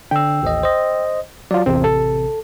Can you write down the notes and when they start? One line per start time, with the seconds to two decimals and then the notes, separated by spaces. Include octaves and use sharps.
0.11 D3 D4 G5 E6
0.43 A1 D#2 D#5
0.63 C5 D#5
1.51 F#3 F4 D5
1.66 A1 E2 C3 C4
1.84 A4